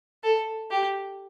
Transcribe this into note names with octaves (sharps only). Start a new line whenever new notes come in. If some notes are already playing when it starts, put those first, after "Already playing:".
A4
G4